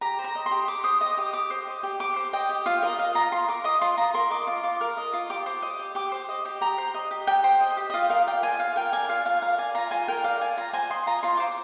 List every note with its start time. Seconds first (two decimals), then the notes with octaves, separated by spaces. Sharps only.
0.01 G4 A#5
0.19 C5
0.24 A#5
0.35 D#5
0.46 C6
0.51 G4
0.68 G4 D6
0.84 C5 D#6
1.01 D#5 D#6
1.17 G4 D#6
1.33 G4 D6
1.50 C5
1.67 D#5
1.83 G4
2.00 G4 D6
2.16 C5
2.33 D#5 G5
2.49 G4
2.66 F4 F5
2.82 A#4 D#5
2.99 D#5 F5
3.15 F4 A#5
3.32 F4 C6
3.48 A#4 D6
3.64 D#5 D#6
3.81 F4 C6
3.97 F4 A#5
4.14 A#4 C6
4.31 D#5 D6
4.47 F4 D6
4.63 F4 D6
4.81 A#4
4.97 D#5
5.13 F4
5.30 G4 D6
5.46 C5
5.62 D#5
5.79 G4
5.95 G4 D6
6.12 C5
6.29 D#5
6.45 G4
6.61 G4 A#5
6.78 C5
6.94 D#5
7.11 G4
7.27 G4 G5
7.44 C5
7.60 D#5
7.77 G4
7.90 D#5
7.94 F4 F5
8.10 A#4 F5
8.26 D5 G5
8.43 F4 G#5
8.59 F4 F5
8.76 A#4 G5
8.93 D5 G#5
9.09 F4 F5
9.25 F4 F5
9.42 A#4 F5
9.58 D5 G#5
9.75 F4 A#5
9.91 F4 G#5
10.08 A#4 G5
10.24 D5 F5
10.41 F4 G#5
10.57 F4 A#5
10.73 C5 G#5
10.90 D#5 C6
11.07 F4 A#5
11.23 F4 C6
11.37 C5 D6